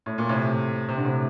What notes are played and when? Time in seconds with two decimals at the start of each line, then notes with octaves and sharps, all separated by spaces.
0.06 A2
0.18 A#2
0.29 A2 C3
0.88 C3
0.96 D3
1.05 A2 C3